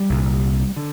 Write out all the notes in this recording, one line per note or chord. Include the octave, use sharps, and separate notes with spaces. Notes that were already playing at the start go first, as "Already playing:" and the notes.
Already playing: G3
C2 A#2
D3